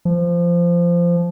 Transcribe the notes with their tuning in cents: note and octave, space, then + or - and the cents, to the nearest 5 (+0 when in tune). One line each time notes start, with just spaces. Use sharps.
F3 -15